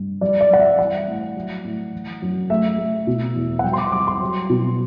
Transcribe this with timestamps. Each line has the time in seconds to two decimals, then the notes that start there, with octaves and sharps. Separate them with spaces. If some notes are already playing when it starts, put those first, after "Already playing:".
Already playing: G2
0.21 G3 D5
0.41 D5
0.51 G3 F#5
0.60 E5
0.78 E3 F#5
1.08 A2
1.36 F#3
1.64 A2
1.93 E3
2.22 F#2
2.50 A3 E5
2.78 A3
3.07 B2
3.36 E2
3.59 F#5
3.64 G3 G5
3.73 C6
3.78 D6
3.92 G3 D6
4.07 C6
4.22 F#3
4.50 B2